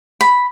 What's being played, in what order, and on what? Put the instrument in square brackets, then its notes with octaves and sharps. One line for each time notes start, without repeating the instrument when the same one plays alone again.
[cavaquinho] B5